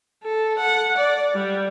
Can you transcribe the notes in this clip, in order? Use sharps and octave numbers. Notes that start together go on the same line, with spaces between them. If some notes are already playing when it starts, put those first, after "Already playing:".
A4
F#5
D5
G3